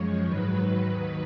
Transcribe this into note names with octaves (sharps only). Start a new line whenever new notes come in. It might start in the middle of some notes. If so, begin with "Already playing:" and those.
Already playing: F#2 F3 G#3 C#5
G#2 D#3 F#3 B4
B4
D#2 D#3 F#3